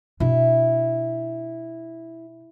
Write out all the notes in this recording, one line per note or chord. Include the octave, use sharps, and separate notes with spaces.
B2 D4 E4